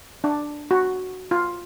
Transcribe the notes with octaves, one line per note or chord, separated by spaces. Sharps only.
D4
F#4
F4